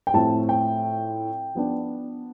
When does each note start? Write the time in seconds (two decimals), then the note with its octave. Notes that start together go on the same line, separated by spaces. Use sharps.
0.07 G5
0.14 A2 F3 C4 A5
0.49 G5
1.55 F3 B3 D4